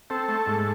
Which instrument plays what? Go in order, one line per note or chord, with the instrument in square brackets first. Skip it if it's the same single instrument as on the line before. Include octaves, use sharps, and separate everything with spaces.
[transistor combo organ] C4 A4
A3
G#2